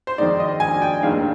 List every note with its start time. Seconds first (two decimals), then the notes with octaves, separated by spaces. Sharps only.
0.07 C5
0.18 F2 D#3 G#3 D#4 D5
0.40 D#5
0.60 G#5
0.82 G5
1.03 F1 D#2 D#3 G#3 D4 F5